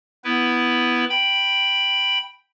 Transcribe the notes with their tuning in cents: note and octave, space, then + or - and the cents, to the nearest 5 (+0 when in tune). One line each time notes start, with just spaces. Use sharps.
B3 +0 E4 +0 B4 +0
G5 +0 B5 +0